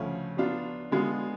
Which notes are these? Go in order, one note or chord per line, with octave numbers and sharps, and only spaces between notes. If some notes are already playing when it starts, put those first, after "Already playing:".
Already playing: D2 C#3 F3 A3 C#4
F#3 B3 D4 F4
D3 G#3 B3 F4